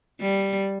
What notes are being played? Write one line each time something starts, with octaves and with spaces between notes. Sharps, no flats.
G3